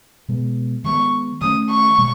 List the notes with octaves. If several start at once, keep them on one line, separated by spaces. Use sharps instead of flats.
B2 G#3 B3
D#3 G#3 B3 C#6
D#3 A3 C#4 D#6
C#6
B2 G#3